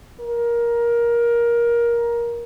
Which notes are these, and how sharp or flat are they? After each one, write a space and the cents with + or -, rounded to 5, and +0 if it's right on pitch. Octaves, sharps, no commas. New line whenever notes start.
A#4 +15